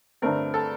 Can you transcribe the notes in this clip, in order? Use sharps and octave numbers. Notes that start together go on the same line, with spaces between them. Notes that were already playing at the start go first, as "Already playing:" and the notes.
G2 D3 A3 C4 A#4
A4